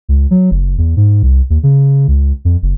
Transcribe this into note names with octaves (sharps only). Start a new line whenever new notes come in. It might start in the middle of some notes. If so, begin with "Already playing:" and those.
C#2
F#3
F#1
E2
G#2
C2
D#2
C#3
C#2
F2
F#1